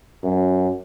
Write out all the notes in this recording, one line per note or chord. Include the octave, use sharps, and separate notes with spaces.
F#2